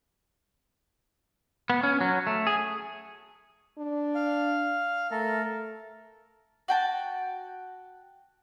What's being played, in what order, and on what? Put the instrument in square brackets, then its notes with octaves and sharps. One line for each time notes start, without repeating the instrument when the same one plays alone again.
[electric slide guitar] B3
C#4
F#3
A3
G#4
[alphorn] D4
[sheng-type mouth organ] F5
[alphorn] A3 [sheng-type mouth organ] A4 A#4
[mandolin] F#4 G5 A5